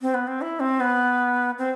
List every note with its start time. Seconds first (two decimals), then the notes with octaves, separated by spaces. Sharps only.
0.02 C4
0.14 B3
0.27 C4
0.41 E4
0.60 C4
0.80 B3
1.58 C4